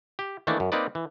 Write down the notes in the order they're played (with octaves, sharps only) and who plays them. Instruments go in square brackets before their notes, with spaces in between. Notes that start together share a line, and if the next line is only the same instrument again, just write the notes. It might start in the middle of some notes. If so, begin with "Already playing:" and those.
[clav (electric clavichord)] G4
D#3 E3 A3 A#3 D4
F#2
A#3 C4 D#4 B4 D5
E3